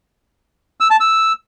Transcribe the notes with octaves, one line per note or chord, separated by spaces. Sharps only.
E6
A5
E6